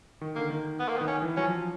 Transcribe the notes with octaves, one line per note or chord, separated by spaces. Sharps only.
D#3
D3 A#3
D#3
B3
A#3
B3
D#3
C#4
E3
F#3 C#4
F3